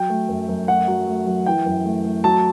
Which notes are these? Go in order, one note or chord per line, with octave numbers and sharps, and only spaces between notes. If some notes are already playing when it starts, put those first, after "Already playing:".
Already playing: F#3 G5
A3
F#2
F#2
A3 F#5
F#3
A3
F#3
E3 G5
F#2
A3
A3
F#3 A5